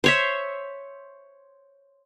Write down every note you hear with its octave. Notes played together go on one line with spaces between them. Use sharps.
C5 C#5 E5